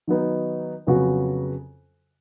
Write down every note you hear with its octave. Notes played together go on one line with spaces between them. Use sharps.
D#3 F#3 B3 D#4
F2 C#3 F#3 B3 F#4